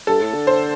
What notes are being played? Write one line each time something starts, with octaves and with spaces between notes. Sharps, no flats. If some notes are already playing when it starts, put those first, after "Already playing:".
G2 A4
A2
D3
C5